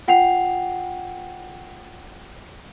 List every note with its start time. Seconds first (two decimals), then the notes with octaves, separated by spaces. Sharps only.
0.08 F4 F#5 G5 C7 F7